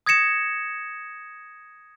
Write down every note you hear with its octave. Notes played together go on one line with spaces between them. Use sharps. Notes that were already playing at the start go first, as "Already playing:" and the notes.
D#6 G#6 A#6 C#7 E7